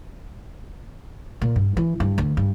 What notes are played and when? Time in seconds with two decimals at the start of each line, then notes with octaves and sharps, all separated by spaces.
1.42 A#2
1.56 G2
1.77 E3
2.00 G2
2.18 D2
2.37 G2